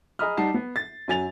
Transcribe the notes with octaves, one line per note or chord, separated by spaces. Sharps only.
G#4 D#5 A#5 B5 D#6 F6
G3 D#4 F#5 A5 C7
B3
A6
F#2 F#3 G#5 A6 F7